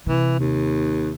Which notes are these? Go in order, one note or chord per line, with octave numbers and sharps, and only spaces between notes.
C3 E3
D#2